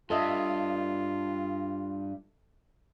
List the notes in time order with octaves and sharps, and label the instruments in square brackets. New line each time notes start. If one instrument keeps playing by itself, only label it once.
[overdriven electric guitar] G2 [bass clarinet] F4 [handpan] A4 D#5 E5